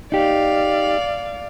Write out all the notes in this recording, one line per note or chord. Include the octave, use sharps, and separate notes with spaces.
D#4 G4 D5 F5